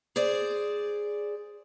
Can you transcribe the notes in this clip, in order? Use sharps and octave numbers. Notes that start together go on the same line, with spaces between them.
G#4 C5 D5